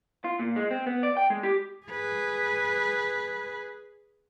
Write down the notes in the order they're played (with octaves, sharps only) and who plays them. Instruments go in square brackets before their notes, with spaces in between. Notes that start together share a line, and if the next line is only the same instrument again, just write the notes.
[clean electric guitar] F4
A#2
G#3
C4
B3
D5
G5
G#3
G4
[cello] G#4 B4